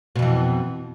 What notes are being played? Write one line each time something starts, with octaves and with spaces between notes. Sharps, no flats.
F2 B2 E3